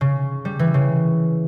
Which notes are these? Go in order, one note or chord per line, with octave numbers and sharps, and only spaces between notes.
C#3
G3
E3
C#3